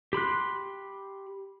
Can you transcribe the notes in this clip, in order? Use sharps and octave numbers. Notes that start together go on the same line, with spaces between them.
G4 B5 C6 F#6